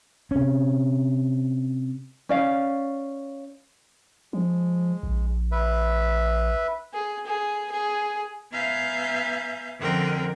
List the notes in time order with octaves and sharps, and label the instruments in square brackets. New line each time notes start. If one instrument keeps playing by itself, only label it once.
[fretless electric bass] C3 C#4
[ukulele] C#4 D5 F5
[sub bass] F3 [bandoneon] G#3
[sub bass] A#1
[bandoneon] B4 E5
[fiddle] G#4
G#4
G#4
[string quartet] B3 E5 F5 G#5 A#5 G6
F2 D3 C4 A#4 F#5 G5